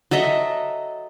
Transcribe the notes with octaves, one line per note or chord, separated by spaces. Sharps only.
F#3 A4 D#5 E5